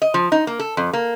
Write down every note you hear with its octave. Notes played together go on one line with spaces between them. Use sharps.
D#5
F3
D#4
A#3
A4
F2
A#3